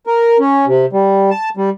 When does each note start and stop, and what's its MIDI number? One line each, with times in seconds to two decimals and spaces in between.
0.07 0.37 70
0.40 0.65 61
0.67 0.86 48
0.93 1.30 55
1.31 1.49 81
1.57 1.70 55